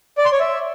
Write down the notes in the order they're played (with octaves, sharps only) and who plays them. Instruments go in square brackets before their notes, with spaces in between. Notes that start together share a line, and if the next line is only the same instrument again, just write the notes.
[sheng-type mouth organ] D5
C6
C#5
E5